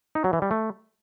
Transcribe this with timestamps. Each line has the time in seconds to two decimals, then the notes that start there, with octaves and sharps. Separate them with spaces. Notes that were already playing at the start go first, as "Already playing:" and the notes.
0.15 D#4
0.24 F#3
0.33 E3
0.42 G3
0.51 A3